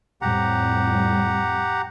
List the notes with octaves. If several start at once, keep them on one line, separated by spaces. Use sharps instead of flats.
F2 A2 G3 G4 F#5 A#5